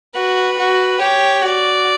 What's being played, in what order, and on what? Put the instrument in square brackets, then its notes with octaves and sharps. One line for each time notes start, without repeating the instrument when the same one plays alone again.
[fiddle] F#4 [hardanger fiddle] B4
[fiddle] F#4
[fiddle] G4 [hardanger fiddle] C#5
[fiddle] F#4 [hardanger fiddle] D5